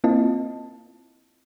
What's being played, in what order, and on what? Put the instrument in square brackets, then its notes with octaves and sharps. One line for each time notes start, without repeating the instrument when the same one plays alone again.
[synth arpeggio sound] A#3 C4 E4 F4 D#5 A5